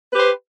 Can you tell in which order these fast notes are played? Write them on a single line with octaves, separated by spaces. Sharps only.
B4 G4 C5